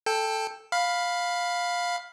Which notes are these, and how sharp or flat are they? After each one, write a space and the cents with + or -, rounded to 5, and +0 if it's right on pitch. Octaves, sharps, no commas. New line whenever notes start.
A4 +0 G5 +20
F5 +10 B5 +0